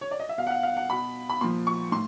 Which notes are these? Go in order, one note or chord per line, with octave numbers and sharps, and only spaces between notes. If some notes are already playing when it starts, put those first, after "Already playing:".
C#5
D5
D#5
E5
B2 F5
F#5
F5
F5
F#5
B2 B5
B5
A#2 F3 C6
C#6
A2 C6